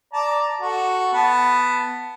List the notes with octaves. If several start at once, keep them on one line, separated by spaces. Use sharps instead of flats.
D5 A5 A#5
F#4 A4
B3 A5